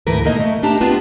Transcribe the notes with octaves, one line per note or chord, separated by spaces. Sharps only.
D2 G#2 E3 A3 A#4 B4
A#2 D#3 A3 A#3 D#5
A3
A3 D4 G4 A5 A#5
B3 C4 D4 F4 B4